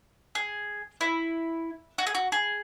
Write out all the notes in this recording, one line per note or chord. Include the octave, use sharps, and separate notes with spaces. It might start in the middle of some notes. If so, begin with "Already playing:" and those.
G#4
E4
F#4
G#4
F#4
G#4